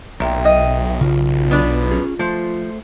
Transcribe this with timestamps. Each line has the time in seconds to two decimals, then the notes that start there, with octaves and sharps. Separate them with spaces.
0.20 B1 A#2 E5 G5
0.45 D#5
1.01 C#3 F4
1.51 B3 D4 B4
1.92 C#4 G#4
2.19 F3 A3 C5